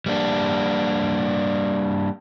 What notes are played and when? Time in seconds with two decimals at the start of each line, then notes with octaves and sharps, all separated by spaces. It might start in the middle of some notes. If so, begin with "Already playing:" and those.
0.06 G3 A#3 D4